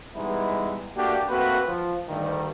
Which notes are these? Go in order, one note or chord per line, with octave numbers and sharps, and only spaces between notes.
E3 G3 G#3 B3 D#4 E4
A3 A#3 D4 F#4 G4
A3 A#3 C4 F#4 B4
F3
D2 G2 D#3